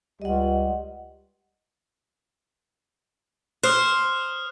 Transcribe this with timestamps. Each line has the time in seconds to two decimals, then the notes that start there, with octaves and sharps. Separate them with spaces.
0.22 C#2 G3 D#5 F#5
3.63 C5 D#6 F6 F#6